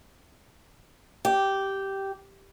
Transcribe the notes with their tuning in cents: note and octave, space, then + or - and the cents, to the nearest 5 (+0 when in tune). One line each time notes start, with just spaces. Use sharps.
G4 -10